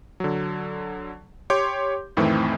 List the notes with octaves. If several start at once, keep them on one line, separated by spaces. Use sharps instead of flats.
D3 F#3
G4 C#5 C6 D6 G6
F2 A2 D#3 E3 A3 C4